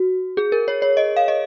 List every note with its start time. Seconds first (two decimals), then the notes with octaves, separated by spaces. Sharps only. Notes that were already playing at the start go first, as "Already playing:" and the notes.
Already playing: F#4
0.37 G#4
0.52 A#4
0.68 C#5
0.82 C#5
0.97 D#5
1.16 F5
1.28 D#5